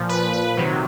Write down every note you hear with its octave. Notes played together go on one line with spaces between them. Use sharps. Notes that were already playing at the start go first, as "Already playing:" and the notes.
Already playing: A#2 F3
B4
B4
C3 D#3 F#3